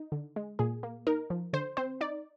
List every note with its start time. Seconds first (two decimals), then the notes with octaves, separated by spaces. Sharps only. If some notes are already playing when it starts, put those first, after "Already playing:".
Already playing: D#4
0.12 D3
0.36 G#3
0.59 A#2 G#4
0.83 A#3
1.07 D#4 A#4
1.30 F3
1.53 D3 C5
1.77 C4 C5
2.01 D#4 D5